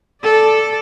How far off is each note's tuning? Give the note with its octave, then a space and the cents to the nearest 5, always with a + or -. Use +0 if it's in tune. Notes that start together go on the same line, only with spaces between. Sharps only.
A4 -5 D5 +0